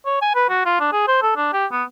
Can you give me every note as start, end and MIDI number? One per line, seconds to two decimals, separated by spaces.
0.06 0.21 73
0.22 0.32 80
0.35 0.45 71
0.50 0.64 66
0.65 0.79 65
0.80 0.91 62
0.92 1.03 68
1.08 1.18 72
1.22 1.32 69
1.36 1.50 62
1.53 1.66 67
1.72 1.84 59